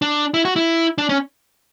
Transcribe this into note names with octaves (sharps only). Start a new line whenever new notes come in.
D4
E4
F#4
E4
D4
C#4